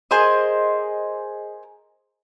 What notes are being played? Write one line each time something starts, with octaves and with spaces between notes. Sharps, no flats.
G#4 A#4 C5 D#5